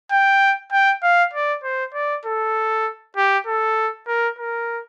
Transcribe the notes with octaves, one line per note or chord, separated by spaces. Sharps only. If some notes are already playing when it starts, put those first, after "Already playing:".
G5
G5
F5
D5
C5
D5
A4
G4
A4
A#4
A#4